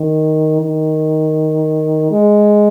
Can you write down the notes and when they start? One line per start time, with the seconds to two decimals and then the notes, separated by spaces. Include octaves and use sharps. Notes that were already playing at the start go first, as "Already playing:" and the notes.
Already playing: D#3
0.61 D#3
2.11 G#3